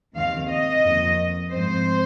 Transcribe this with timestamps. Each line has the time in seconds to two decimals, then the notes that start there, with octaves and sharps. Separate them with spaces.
0.15 D#2 D#3 C4 F5
0.49 D#5
0.83 F2 D#3 A#3
1.51 G#2 F3 C4 C5